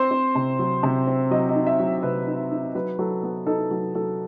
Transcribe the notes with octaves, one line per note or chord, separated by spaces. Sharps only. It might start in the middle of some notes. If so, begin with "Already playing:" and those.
Already playing: C4 C5
C4
C3
F#3
C3
C4
F#3 D#5
D#5
D#4
E5
F#3
C3 B4
D#4
D#4
F#3 B4
F#3 A4
B3 B4
D#4 A4
F#3
F#3 A4